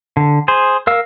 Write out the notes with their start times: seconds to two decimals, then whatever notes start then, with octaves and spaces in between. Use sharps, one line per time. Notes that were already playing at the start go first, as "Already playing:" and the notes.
0.17 D3
0.48 G#4 C5
0.87 A#4 F5 E6